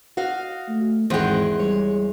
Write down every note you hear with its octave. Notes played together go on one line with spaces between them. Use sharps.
F#4 D#5 F5
A3
G#1 E2 G#3 C5 F#5 G5
G3 C#5